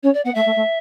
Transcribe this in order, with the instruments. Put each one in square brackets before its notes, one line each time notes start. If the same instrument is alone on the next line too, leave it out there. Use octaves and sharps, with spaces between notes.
[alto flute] C#4 [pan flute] C#5
[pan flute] D5
[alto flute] B3 [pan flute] F#5
[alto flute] A3 [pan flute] E5
[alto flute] A3
A3